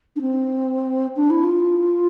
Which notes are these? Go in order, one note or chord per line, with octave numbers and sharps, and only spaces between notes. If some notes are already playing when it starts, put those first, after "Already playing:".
D4
C4
D4
E4
F4